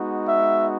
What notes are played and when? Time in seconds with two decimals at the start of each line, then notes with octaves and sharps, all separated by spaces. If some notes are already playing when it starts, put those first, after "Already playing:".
Already playing: G#3 B3 D#4 F#4
0.28 E5